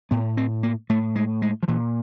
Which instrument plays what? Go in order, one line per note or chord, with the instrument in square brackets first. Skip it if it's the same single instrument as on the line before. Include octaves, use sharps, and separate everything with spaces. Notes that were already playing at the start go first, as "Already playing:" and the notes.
[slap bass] A2 B3
C4
A#3
A2 A3
G#3
G#3
F3
A#2 E3